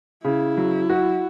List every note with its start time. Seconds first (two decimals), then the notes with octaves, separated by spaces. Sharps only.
0.24 C#3 E4
0.57 F#3
0.90 F#4